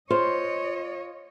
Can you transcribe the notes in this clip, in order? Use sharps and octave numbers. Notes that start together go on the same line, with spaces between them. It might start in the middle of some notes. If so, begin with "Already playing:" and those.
F4 C5 C#5 D#5